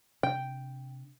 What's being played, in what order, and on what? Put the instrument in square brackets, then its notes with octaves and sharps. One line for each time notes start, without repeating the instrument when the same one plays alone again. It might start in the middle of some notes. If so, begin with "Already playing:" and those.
[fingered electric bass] C3 D4 [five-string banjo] G5